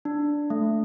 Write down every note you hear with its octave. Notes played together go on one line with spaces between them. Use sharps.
D4
A3